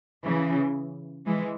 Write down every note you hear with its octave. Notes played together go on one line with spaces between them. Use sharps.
C#3 E3
E3 G#3